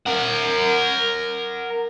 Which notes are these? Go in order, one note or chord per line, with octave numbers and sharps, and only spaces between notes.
A#4 F#5